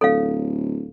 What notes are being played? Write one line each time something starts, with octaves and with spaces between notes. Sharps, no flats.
D1 A4 C#5 F5